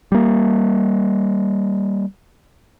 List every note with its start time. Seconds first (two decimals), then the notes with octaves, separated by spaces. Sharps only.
0.12 G3 A#3